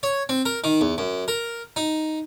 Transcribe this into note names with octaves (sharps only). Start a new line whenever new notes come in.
C#5
C4
A#4
D#3
E2
F#2
A#4
D#4